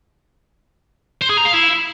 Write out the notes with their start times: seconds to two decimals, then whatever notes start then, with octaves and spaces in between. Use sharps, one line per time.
1.22 C5
1.30 G#4
1.38 A#5
1.46 F5
1.53 E4